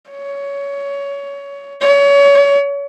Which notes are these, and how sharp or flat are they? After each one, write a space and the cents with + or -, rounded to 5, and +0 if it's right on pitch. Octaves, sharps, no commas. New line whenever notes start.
C#5 +20
C#5 +30